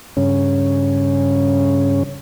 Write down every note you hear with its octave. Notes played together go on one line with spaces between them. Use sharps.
G2 C#3 C#4